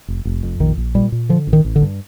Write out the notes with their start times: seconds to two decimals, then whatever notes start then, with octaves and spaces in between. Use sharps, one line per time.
0.08 F1
0.25 F1
0.43 F2
0.60 A#1 D#3
0.78 A#1
0.95 A#2 G3
1.12 A#2
1.29 D3 F3
1.47 A1
1.53 D#3
1.65 A1
1.76 D3
1.82 G2